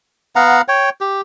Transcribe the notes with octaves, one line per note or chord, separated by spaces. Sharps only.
B3 F5 F#5 A#5
C#5 G5
G4